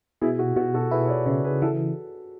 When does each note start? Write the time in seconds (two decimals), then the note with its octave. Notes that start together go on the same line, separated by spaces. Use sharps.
0.21 B2 E4 G#4
0.39 F#4
0.56 B2 F#4
0.74 F#4 A4
0.91 E4 G#4 B4
1.05 C#5
1.09 B4 D5
1.26 C#3 B4 D5
1.45 G#4 B4
1.62 E3 F#4 A4